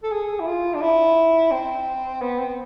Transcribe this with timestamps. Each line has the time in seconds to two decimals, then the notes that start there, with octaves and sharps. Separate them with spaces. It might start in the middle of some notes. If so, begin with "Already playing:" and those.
0.03 A4
0.11 G#4
0.40 E4
0.47 F4
0.74 D4
0.81 E4
1.51 C4
2.22 B3
2.39 C4